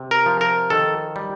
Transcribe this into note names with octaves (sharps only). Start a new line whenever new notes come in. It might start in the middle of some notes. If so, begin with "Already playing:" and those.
Already playing: C3
A#4
F3
A#4
D#3 A4
G3